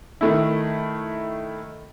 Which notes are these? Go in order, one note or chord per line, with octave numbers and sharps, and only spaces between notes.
D#3 A3 E4